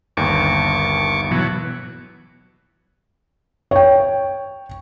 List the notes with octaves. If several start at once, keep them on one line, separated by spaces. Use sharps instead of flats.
G1 D#2 C#6 D6
B2 E3 F#3
C#5 G5